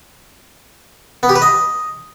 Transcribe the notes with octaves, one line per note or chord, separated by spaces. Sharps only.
B3
G4
B4
D#5